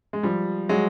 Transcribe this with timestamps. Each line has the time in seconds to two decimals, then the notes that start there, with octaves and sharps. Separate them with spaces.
0.13 G#3
0.23 F3 G3
0.69 F#3 G#3